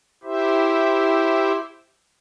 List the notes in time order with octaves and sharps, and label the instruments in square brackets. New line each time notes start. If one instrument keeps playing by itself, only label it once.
[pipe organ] E4 G4 C5 E5